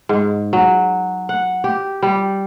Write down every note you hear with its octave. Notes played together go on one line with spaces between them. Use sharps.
G#2
F#3
F#5
G4
G3